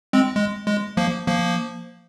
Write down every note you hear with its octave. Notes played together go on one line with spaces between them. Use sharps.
G#3 C4
G#3
G#3
F3 A#3
F3 A#3